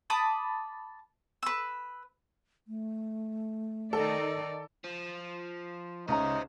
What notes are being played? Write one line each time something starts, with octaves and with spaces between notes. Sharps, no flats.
A5 B5 D6 D#6
B4 E6
A3
D#3 D#4 A4 D5
F3
C#2 C#4 D#4 C5 E5 A#5